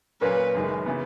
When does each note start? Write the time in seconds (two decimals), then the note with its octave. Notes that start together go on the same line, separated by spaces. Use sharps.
0.21 A#2 F#3 A#3 C#4 B4
0.54 F#1 F#2 D#3 G#3
0.86 C#3 E3 B3